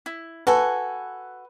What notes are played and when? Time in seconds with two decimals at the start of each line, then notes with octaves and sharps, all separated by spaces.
0.06 E4
0.47 F#4 A4 B4 G#5